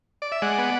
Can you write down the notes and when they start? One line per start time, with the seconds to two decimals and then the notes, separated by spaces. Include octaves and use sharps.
0.22 D5
0.32 E5
0.42 G#3 D5 F#5
0.58 B3